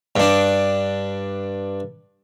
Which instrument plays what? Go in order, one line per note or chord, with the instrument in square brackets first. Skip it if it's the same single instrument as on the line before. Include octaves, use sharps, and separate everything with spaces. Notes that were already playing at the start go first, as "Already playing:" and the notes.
[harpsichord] G2 D4